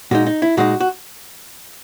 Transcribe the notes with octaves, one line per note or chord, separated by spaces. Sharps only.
A#2 G#3 D#4 F#4
D#4
E4
A#2 G#3 D#4 F#4
F#4